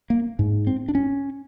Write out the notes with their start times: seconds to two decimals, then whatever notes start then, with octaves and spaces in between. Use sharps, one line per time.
0.10 A#3
0.39 G#2
0.67 C4
0.88 D4
0.95 C#4